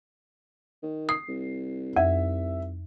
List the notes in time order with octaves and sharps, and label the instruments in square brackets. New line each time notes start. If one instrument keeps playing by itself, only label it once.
[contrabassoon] D#3
[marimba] D#6 [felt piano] C7
[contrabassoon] C2
[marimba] F2 [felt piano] E5